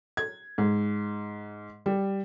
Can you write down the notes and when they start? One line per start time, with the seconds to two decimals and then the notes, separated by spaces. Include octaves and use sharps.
0.17 G#6
0.58 G#2
1.86 G3